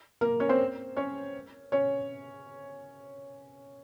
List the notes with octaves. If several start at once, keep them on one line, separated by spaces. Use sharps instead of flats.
A#3 A#4
C#4 C#5
C4 C5
C#4 C#5
C#4 C#5